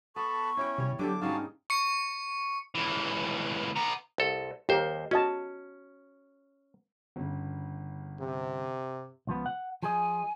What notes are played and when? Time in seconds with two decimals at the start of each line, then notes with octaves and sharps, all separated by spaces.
0.16 B3 A4 A5 B5 C#6
0.57 C#4 E4 C#5 G5
0.78 C3 G3 C#5
0.99 D3 F#3 D4 G4 A4 D6
1.21 G#2 C#3 G3 D#4 F#4 F5 A5
1.70 C#6 C#7
2.75 C#2 E3
3.76 B3 A#5
4.18 C2 A4
4.69 D#2 G4 A#4 C5
5.11 C#4 F#4 D#5 A5
7.16 G1 C#3
8.20 C3
9.27 C#2 F3 B3
9.46 F#5
9.83 F3 G#4 D#5 G#5